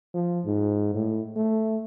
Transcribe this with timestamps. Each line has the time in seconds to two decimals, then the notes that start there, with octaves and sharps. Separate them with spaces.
0.14 F3
0.45 G#2
0.94 A2
1.36 A3